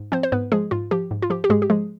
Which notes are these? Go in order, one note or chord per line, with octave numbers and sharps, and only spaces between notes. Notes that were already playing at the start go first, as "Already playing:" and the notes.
Already playing: G#2
F3 C4 C5
C5
G#2 B3 B4
F3 G#3 G#4
G#2 F4
F3 G4
G#2
F4
F3 G4
G4
G#2 G#3 G#4
G4
F3 G#3 G#4